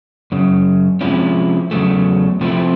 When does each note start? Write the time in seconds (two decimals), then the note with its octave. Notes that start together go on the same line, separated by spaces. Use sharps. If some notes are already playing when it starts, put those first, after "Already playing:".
0.32 F#2 C#3
1.01 C3 F3 G#3 C#4 E4
1.71 E2 C#3 F#3 A3
2.41 C3 F3 A3 C4 E4